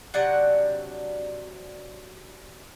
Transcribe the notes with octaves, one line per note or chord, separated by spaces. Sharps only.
C3 F#3 D4 F#5